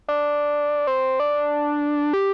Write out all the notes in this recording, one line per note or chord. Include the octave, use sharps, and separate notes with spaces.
D4
C4
D4
G4